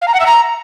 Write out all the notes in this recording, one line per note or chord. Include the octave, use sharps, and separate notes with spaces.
F5
A#5
F#5
E5
A#5